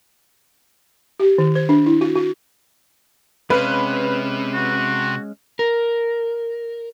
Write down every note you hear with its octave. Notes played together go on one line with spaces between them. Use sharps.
G4
D#3
C5
D4
E4
F#4
F#4
C3 G#3 C#4 B4 F5
F#4
A#4